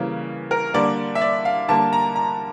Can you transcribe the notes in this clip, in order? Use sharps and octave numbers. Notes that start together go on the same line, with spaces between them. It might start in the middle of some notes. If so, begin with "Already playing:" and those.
Already playing: C#3 E3 G3 A#3
A#4
D3 G3 A#3 D5
E5
D5
F5
D3 G3 A#3 A5
A#5
A#5